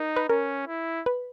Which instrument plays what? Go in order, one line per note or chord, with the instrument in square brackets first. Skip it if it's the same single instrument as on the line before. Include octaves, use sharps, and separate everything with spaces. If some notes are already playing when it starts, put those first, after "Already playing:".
Already playing: [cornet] D#4 [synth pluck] A#4
[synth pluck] B4
[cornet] C#4 [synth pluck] A#4
[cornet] E4
[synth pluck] B4